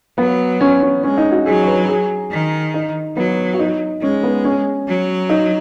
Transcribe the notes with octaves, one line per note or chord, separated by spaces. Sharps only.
F#3 B3
C#4
C#4
G#3 C#4
D#4
F#4
F#3 G#4
C#5
B4
G#4
D#3
D#4
F#3 B3
F#4
D#4
G#3 C#4
B3
C#4
F#3
D#4